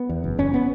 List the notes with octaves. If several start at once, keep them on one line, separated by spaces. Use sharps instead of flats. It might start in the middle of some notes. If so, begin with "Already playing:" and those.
Already playing: B3
E2
F#1
F#1 C#4
B3